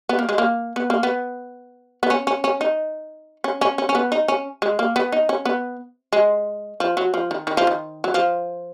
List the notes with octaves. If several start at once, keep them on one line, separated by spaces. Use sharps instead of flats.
B3
A#3
G#3
A#3
B3
A#3
B3
B3
C#4
C#4
C#4
D#4
C#4
C#4
C#4
C#4
B3
D#4
C#4
G#3
A#3
B3
D#4
C#4
B3
G#3
F3
F#3
F3
D#3
D#3
F3
D#3
F#3
F3